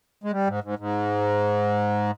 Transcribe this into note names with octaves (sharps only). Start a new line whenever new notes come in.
G#3
G3
G#2
G#2
G#2